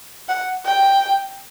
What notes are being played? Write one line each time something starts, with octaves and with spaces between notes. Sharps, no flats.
F#5
G5